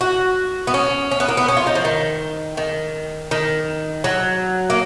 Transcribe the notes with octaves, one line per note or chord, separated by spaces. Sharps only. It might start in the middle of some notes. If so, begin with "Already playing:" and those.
F#4
B3
C#4
C#4
B3
A#3
B3
C#4
F4
D#4
F3
D#3
D#3
D#3
F#3
A#3